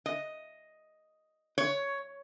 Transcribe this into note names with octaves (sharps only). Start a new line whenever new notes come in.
D#5
C#5